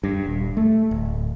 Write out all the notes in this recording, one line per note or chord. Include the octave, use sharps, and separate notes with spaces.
G2
D#1
A3
D1